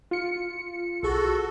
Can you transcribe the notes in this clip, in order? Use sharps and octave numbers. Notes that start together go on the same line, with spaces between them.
F4 C#7
B1 F#4 G#4 A4